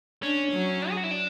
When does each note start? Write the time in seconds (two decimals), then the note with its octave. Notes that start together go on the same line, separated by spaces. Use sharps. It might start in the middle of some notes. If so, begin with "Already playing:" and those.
0.23 C#4 D4
0.52 F#3
0.90 G#4
0.97 F#4
1.04 E4
1.11 D4